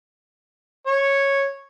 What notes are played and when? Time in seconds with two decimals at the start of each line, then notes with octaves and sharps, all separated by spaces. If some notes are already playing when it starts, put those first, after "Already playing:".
0.86 C#5